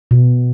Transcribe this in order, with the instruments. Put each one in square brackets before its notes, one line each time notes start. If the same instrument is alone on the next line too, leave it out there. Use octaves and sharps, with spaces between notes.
[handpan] B2